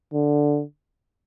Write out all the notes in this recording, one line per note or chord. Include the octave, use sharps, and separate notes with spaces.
D3